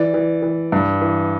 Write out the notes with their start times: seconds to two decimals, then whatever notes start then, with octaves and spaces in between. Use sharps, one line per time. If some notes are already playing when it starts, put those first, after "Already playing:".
Already playing: E3 D5
0.14 E3
0.42 E3
0.72 G2
1.02 E3